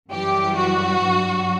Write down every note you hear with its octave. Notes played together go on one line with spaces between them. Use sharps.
F#2 E3 G3 G4
F#4
G2 F#3